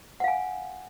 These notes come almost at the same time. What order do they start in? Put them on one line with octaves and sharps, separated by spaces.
F#5 F5 G#5